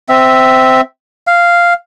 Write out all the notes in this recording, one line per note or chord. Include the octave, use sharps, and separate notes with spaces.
C4 E5
F5